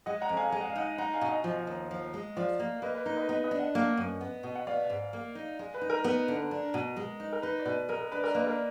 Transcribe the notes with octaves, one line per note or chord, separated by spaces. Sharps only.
G#3 D#5 F#5
F#5 A#5
F2
F5 G#5
G#3 G#5
F#5
F5
D#4 D#5 F#5
D#4 F#5 A#5
F5 G#5
B2
D#5 F#5
F3
D#2
F3
G#3
F3 D5 F5
A#3
A#3 B4 D#5
B4
D#4 B4
B4 D#5
B3 B4 D#5
B4 D#5
D4
D#5 F#5
A#3
F#2
B3
B2
F#5
B3 D5 F5
G#2
A#3
D#4
G#3
B4
D#4
A#4
B3 A#4
D3
D4
B2
G#3
D#4
A#4
D#4 B4
D5
B2 B4
G#3 A#4
A#4
D4 B4
A#4 D5
A#3 B4 D#5
A#4 D5